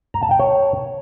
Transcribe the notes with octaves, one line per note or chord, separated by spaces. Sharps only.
A#5
A5
G5
C#5